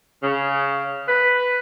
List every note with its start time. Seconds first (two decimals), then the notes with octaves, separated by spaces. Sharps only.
0.22 C#3
1.08 B4